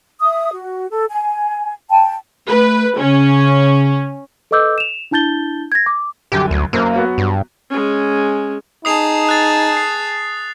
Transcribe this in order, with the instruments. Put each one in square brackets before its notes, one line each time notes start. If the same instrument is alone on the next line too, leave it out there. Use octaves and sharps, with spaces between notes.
[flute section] E5 D#6
F#4
A4
G#5
G5 A5
[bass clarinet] A3 [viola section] B4
[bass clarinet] C#3 [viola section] C#4
[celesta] A4 B4 D#5 D6 E6 G6
E7 F7
D4 E4 A5 G6 A6 G7
G#6 A#6
D6
[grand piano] C2 F#2 D3 [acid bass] G4
[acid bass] D2
[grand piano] F#1 F#2 C5 [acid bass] A#3
[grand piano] F#3 B3 F#4
[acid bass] G2
[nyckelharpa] G#3 C#4
[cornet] D#4 [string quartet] G#4 A5 [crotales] D#6 C7 F7
[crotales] F#6 A6
C7